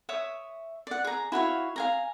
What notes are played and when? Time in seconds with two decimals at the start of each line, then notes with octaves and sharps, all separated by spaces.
0.09 C#5 E5 D#6
0.87 D5 F#5
1.04 G#4 A#5
1.32 E4 F#4 C#5 F5
1.76 F5 G#5 A#5